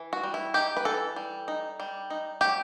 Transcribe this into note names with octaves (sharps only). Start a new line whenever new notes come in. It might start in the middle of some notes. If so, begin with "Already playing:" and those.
Already playing: E3
F#4
G3
E4
D#4 G4
B4
E3 A4
G3
D#4
G3
D#4
F#3 G4